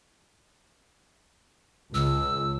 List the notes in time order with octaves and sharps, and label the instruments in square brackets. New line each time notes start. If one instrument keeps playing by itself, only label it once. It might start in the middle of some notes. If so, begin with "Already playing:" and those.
[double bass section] C#2 [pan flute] E6